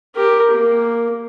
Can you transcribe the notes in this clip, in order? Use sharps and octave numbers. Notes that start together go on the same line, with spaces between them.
G4 A#4
A#3